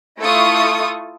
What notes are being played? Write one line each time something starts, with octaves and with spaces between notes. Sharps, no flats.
A3 E4 F4 A4 C#6 D#6